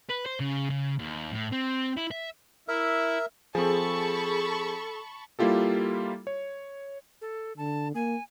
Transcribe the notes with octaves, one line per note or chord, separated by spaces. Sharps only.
B4
C5
C#3
C#3
D#2
A2
C4
E4
E5
E4 A#4 E5
F3 C4 G#4 A4 A5 B5 C#6
G3 A#3 E4 F4 G4 A4
C#5
A4
D3 A5
A#3 G#5